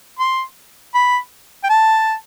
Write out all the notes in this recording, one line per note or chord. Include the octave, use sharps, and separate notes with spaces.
C6
B5
G5
A5